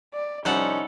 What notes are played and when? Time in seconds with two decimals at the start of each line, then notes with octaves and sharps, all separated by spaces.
0.14 D5
0.45 C2 F3 G3 C#4 D#4 A4 F#5